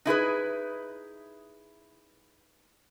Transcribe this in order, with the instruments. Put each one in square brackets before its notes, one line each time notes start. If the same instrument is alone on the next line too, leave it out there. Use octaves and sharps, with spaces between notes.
[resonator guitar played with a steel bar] D#4 E4 G#4 B4